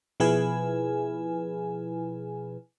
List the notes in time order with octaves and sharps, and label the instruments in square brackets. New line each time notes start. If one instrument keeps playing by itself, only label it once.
[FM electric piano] B2 F3 E4 G#4 B4 G#5